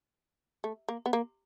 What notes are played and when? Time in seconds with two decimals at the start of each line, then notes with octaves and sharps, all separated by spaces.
0.64 A3
0.89 A#3
1.06 B3
1.13 A#3